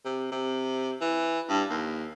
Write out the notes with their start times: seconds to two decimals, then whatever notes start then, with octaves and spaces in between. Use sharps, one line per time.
0.05 C3
0.32 C3
1.01 E3
1.49 G2
1.70 D#2